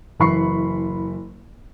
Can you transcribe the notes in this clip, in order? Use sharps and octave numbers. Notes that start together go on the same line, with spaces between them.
F#1 E3 B5 C#6 C7